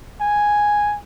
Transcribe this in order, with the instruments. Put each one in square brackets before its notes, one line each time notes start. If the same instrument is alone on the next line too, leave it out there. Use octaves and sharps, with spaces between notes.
[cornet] G#5